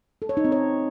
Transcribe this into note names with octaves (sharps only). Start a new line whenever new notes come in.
A4
C#5
D#4
C4
C#5